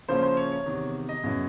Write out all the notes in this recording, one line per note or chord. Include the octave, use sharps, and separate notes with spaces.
C#3 F3 A#3 C#4 E4 C5
C5
C#5
C#5
E2 C3 D#3
D#5
F#2 C#3 F#3 B3 E4